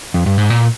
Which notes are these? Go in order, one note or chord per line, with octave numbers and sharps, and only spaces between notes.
F2
G2
G#2
A#2